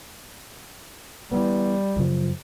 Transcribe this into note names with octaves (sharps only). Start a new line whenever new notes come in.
E3 G3 B3
F#2 C#3 F3